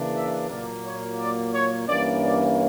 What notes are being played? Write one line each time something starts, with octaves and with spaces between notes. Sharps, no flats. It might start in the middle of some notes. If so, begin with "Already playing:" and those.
Already playing: C#3 E3 A#3 D4
E5
A#2 F#3 A#3 D5
C#5
D5
C#5
G2 E3 A#3 C#4 D5
D5